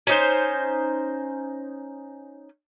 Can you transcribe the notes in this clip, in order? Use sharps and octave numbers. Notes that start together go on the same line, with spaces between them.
C#4 D#4 C5